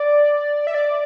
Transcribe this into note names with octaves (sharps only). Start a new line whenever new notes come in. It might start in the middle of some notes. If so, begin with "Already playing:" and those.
Already playing: D5
E5
D5